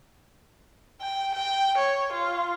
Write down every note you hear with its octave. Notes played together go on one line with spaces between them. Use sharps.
G5
G5
C#5
F4